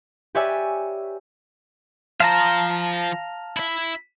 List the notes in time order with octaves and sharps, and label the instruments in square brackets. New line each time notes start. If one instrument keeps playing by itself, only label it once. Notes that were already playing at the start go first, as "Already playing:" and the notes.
[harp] G4 B4 C#5 D5 E5 G#5
[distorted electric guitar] F3 C5 [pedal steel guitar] F5 A5 A#5
[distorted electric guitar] E4 E5